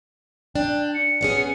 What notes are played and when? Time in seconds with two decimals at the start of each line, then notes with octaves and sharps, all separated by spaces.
0.55 D4 G5
0.95 C#7
1.21 B3 C#4 G#4